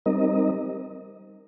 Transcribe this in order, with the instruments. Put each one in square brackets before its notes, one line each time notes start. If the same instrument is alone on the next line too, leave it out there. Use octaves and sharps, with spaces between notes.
[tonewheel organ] G3 C4 D#4 A#4 D#5